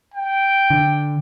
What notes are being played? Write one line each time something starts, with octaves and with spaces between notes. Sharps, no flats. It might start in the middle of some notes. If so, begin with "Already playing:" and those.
G5
D3